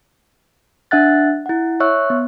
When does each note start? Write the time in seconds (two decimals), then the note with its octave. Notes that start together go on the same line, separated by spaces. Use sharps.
0.91 D4 E5 F#5 F#6 A6
1.46 E4 F#5
1.80 C#5 E5 C#6 E6 F#6
2.10 B3